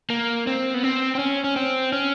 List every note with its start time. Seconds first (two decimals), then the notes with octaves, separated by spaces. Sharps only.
0.10 A#3
0.47 C4
0.74 B3
0.83 C4
1.15 C4
1.19 C#4
1.44 C#4
1.56 C4
1.93 C#4